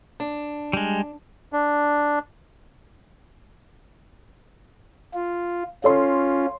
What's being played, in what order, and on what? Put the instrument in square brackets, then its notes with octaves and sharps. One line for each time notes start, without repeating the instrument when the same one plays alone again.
[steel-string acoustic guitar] D4
[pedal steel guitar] G3 G#3
[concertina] D4
[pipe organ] F4
[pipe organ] C#4 F4 [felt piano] A4 C#5 C6